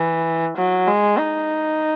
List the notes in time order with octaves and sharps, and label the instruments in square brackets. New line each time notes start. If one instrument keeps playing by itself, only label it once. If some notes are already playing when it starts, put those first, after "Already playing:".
Already playing: [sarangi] E3
F#3
G#3
D#4